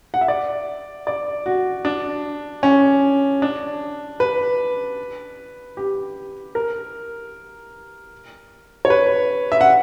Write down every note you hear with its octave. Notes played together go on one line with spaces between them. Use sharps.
F#5
E5
D5
D5
F#4
D4
C#4
D4
B4
G4
A#4
C#5
B4
E5
F#5